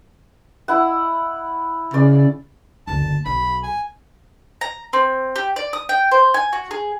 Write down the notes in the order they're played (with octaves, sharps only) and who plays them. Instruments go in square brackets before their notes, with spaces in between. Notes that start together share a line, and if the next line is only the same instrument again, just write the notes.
[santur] E4 F#5
[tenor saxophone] C#3 [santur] D5
[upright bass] F#1 D2 [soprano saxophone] A5
[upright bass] B1 [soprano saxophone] B5
[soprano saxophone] G#5
[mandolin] A#5
C4
G4
D5
D#6
G5
C5
G#5
F#4
G#4